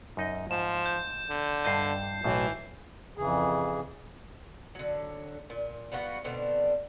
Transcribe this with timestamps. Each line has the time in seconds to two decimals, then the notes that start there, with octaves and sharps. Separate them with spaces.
0.17 F#2 D#4 D#5
0.51 G#2 F3 E7
0.86 G6
1.30 D3
1.65 G2 D#5 G6 C7
2.24 B1 A2 E3
3.17 F2 C#3 E3 G#4
4.75 D3 F#3
5.50 A#2
5.92 G3 B3 F4 F#4
6.24 B2 D3 C4